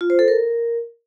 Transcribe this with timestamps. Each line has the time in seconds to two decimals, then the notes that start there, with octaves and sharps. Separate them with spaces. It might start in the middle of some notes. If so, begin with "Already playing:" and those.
0.01 F4
0.10 C5
0.19 A4
0.28 A#4